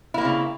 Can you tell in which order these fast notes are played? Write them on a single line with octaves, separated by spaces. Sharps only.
E4 A#3 C4 C#3